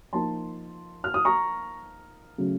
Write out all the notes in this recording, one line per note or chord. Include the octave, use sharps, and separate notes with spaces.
F3 A#3 D#4 A5 C6
F6
D#6
A#5 C#6
C#3 F#3 A3